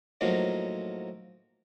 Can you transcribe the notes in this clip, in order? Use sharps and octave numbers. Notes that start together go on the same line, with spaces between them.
A2 F3 F#3 A#3 D#4